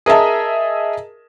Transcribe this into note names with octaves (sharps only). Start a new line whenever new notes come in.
G#4 A#4 D#5 E5 A5